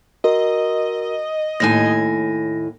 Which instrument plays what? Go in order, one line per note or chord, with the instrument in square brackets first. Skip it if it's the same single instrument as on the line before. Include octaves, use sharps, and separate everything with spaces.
[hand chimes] F#4 A#4 [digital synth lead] D#5
[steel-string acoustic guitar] D#2 A2 G#5 [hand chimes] A#6